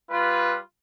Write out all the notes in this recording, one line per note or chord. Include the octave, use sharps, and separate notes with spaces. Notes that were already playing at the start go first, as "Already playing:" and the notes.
G3 F4 B4